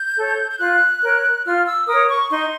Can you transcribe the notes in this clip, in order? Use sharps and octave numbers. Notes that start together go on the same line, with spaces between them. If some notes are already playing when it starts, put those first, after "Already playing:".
Already playing: G6
A4 C#5
G6
F4 F#6
A#4 C#5
F4 F6
E6
A#4 C#5 D#6
C#6
D#4 C6